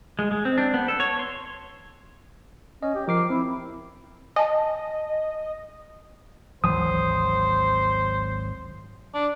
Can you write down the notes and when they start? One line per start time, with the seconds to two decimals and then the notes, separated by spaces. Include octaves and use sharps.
0.19 G#3
0.31 G#3
0.45 C4
0.58 D4
0.74 B3
0.88 A4
1.00 C#5
1.19 C6
2.83 C#4 D#5
2.95 G4
3.08 F3 A#4 D6 C7
3.30 C4 E4
4.36 D#5 G#5 A5
6.64 G#1 D2 E3 F#3 C5 D#6
9.14 D4